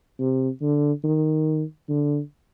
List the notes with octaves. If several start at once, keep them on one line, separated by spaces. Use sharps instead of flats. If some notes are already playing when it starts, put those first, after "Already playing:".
C3
D3
D#3
D3